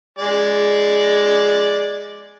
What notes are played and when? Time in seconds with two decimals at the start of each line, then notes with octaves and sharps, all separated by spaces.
0.19 G#3 D5